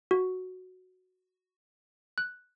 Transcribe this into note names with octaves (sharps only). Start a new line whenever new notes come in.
F#4
F#6